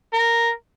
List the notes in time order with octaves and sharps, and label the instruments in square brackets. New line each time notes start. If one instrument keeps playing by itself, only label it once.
[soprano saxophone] A#4